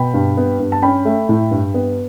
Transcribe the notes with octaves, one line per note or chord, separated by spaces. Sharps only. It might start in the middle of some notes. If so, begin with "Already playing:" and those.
Already playing: B2 G5 B5
G2
B3
G2
A5
C#4 G5 B5
A3
A2
G2
B3